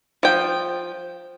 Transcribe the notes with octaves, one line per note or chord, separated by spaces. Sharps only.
F3 G5